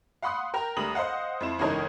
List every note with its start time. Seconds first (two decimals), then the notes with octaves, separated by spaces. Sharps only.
0.22 F5 F#5 B5 C6 D#6 F#6
0.54 A#4 G5 A#5
0.76 D2 G3 A#5 D#6 F#7
0.95 C5 D#5 F5 F#5
1.40 F2 E4 E7
1.59 G1 C#2 E3 D#4 A#4 C#5